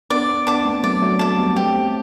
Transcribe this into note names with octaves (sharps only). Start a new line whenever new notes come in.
B3 D4 D5
B3 D4 A5 D6
A3 C4
F#3 A3 D5
F#3 A3
F#3 A3 A5 D6
G3 B3
A3 C4 G4